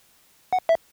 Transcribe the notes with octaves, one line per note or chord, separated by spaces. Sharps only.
F#5
E5